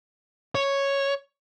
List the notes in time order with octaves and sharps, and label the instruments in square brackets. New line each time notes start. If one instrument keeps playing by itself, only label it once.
[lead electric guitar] C#5